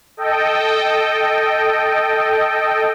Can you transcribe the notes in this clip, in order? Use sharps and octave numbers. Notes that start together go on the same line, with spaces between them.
A4 D#5 G5